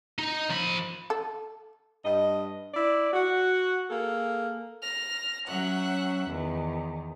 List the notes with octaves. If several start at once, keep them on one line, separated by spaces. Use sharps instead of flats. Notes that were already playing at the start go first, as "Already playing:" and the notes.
D#4
F3 B5
A4
G2 D#5
E4 D5
F#4
A#3 G#4 A4
F6 A#6
F#3 C#4 E5 F#5 F#6
E2 D#3